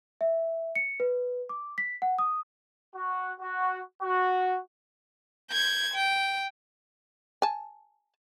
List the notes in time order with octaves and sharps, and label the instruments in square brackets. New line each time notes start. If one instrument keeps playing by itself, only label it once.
[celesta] E5
C#7
B4
D6
B6
F#5
D#6
[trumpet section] F#4
F#4
F#4
[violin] G6 G#6
G5
[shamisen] G#5 A5